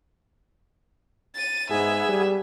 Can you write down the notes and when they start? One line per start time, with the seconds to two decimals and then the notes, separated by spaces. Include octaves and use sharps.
1.35 A6 D#7
1.71 G#2 B3 G#4 E5
2.09 G3